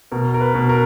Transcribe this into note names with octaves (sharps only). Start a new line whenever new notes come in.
B2 A#4
A#4
B4
B2
A#4